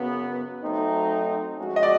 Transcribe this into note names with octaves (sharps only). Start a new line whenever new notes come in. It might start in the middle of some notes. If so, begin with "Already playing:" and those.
Already playing: F#2 C#3 F#3 B3
F#3 A3 C4 D#4
F3 G#3 C#4 F#4
D#5
D5